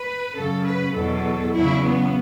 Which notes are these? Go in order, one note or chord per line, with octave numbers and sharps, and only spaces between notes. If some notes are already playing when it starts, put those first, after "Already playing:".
Already playing: B4
F#2 C#3 F#3 A4
B4
E2 B2 F#3 A4
E2 C#3 F#3 E4
B3